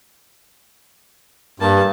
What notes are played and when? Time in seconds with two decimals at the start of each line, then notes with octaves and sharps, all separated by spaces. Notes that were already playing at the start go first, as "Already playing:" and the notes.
1.60 G2 A#3 A5